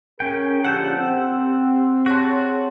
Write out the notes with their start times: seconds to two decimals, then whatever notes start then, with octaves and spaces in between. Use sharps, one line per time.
0.20 C#4 G#4 A#4 G5
0.64 A#2 D3 F3 G4 F#5 A5 E6 G6
0.97 C4
2.06 F#4 G#4 C#5 A5 C6